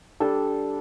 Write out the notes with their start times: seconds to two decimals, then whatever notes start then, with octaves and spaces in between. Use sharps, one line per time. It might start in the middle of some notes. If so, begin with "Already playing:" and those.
0.20 G3 D4 A4